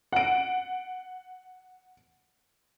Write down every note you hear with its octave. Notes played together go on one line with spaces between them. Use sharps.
F#5 D7